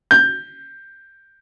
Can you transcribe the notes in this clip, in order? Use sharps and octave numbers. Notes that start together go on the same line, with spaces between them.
G6